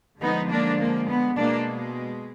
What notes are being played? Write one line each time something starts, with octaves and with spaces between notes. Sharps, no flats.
D3 F3 G#3 B3 D#4
A#3 D4
A#3
B3
B2 G#3 A#3 D4